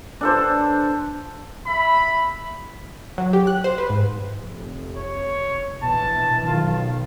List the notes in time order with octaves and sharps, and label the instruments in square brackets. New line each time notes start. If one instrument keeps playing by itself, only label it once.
[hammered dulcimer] D4 A4 C5
[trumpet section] E5 B5
[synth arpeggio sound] F#3
G4
F#6
C5
B4
G#2
[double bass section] F1
[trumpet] C#5
[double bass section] A#1 B2 E3 [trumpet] A5
[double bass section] B1 D#3 [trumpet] F4